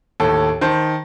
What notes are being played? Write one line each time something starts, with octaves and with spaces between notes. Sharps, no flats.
D#2 A2 A4
D#3 C5 A5